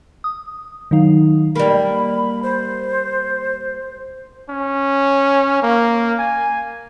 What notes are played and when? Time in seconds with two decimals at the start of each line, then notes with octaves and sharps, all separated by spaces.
0.24 D#6
0.91 D#3 F#3 D#4 F5
1.56 G3 A#3 B5
2.43 C5
4.49 C#4
5.62 A#3
6.19 G#5